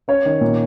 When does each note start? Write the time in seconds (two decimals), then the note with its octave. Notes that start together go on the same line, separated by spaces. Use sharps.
0.08 C#4 C#5
0.25 D#3
0.41 A#2